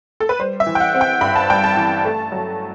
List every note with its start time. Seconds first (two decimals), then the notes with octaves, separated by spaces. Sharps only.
0.20 A4
0.29 B4
0.39 G3 C5
0.60 E5
0.67 E3
0.75 G5
0.80 F#5
0.94 C4
1.01 G5
1.21 G2 B5
1.36 A5
1.50 G3 G5
1.64 A5
1.77 E3
2.05 A3
2.32 F#3